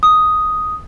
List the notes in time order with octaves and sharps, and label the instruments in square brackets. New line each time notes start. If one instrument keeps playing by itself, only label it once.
[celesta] D#6